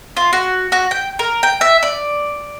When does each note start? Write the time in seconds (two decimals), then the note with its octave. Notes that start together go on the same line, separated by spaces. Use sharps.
0.17 F4
0.33 F#4
0.72 F#4
0.91 G5
1.19 A#4
1.43 G5
1.61 E5
1.83 D5